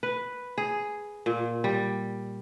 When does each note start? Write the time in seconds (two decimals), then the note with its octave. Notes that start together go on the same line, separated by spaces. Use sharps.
0.03 B4
0.58 G#4
1.26 A#2
1.64 G3